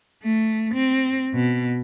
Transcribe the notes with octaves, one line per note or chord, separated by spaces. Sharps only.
A3
C4
B2